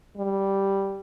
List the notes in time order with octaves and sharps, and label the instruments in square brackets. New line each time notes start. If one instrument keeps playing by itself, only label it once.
[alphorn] G3